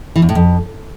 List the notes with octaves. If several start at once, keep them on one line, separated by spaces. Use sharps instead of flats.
E3
E2
A2
F2